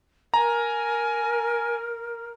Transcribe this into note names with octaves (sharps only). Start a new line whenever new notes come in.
A#4 G#5 A#5